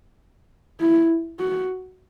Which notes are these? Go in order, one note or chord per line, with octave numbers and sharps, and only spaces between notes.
E4
F#4